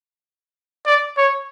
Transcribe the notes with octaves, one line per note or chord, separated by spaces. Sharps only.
D5
C#5